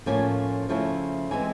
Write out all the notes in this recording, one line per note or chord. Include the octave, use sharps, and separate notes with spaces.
A2 F3 A#3 C#4 G#5
C#3 F3 A3 C#4 E4
C#3 E3 G#3 C4 G#5